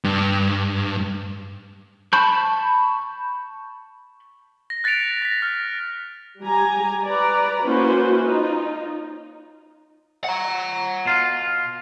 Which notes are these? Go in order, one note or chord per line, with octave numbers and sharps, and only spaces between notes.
G2
A5 B5 C#6 G6
A#6
F#6 A6 B6 C#7 D7 F7
A#6 B6
F6
G3 G4 G#5 A#5
B4 D5 A#5
A#3 C#4 E4 F#4 B4 C5
D#4 F4
F#5 A#5
B2 F4